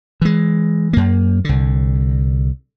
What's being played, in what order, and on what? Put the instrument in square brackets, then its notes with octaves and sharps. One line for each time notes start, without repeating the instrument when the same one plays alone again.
[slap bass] E3 G#3
F#2 A#3
C2 D3